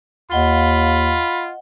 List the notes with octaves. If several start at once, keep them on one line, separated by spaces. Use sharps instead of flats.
D#2 F4 D#5 F#5 B5 G7